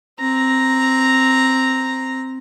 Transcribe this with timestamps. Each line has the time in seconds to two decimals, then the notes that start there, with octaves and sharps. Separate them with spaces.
0.20 C4 A#5